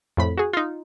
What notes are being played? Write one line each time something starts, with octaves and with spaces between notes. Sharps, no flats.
F2 A2 B5
F#4 G#4
D#4 F4